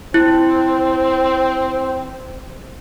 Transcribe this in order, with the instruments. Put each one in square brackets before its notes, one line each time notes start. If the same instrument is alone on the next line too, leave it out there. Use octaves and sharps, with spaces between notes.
[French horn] C4 [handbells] E4